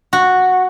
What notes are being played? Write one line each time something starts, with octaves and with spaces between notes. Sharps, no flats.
F#4